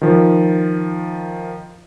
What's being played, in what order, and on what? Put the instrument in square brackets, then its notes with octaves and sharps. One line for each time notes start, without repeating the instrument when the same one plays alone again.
[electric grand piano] D#3 F3